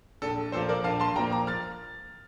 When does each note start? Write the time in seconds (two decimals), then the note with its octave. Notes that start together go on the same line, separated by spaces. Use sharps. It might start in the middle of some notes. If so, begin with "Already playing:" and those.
0.22 A#1 A4
0.52 A#2 F3 A#3 A4 C5
0.69 A#4 D5
0.84 A#1 F5 A5
1.00 A5 C6
1.15 A#2 F3 A#3 G5 A#5
1.31 A#5 D6
1.47 F6 A6